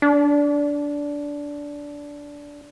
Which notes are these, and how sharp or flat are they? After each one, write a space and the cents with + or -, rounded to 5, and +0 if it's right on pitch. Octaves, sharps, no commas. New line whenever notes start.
D4 -15